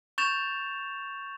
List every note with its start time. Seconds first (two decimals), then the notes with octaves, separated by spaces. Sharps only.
0.18 C#6 G6 A6 E7 F7